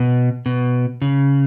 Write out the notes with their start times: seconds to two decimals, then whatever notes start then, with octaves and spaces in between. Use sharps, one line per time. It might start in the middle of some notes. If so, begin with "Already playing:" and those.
Already playing: B2
0.46 B2
1.02 C#3